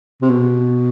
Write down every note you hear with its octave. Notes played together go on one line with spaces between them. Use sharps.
C3
B2